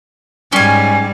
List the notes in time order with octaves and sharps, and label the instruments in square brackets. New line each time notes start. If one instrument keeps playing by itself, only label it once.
[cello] G#2 G3 [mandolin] C#4 G#5